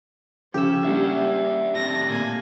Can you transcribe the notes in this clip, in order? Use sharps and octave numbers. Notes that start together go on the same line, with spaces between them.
C#3 F3 C#4 G4 E6
G3 A#3 D4 E5 F#5
A2 C4 D4 A#6
A#2 A#3 G#5